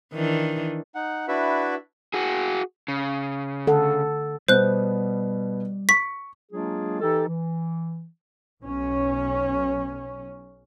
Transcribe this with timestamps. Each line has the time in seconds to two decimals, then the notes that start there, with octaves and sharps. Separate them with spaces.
0.13 D#3 E3 D4
0.95 D#4 F#5
1.28 D4 E4 F#4 B4 E5
2.14 F#4 G#4
2.88 C#3
3.67 D3 A4 F#5
4.48 B2 G3 B3 C5 F#6
5.89 C#6 B6
6.52 F#3 G#3 A#3 D4 F4 G#4
7.01 E3 D#4 G4 A4
7.27 E3
8.63 B1 C#4